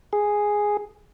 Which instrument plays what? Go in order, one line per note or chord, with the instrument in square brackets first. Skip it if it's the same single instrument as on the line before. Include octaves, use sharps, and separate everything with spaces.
[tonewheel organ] G#4